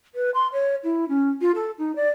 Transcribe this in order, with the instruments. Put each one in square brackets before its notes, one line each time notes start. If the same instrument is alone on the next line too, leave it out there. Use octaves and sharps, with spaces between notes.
[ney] B4
C6
C#5
E4
C#4
F4
A4
D#4
D5